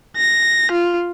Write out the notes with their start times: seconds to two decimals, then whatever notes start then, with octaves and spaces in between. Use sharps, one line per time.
0.17 A#6
0.72 F4